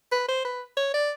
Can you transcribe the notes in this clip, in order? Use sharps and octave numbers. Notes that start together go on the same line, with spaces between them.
B4
C5
B4
C#5
D5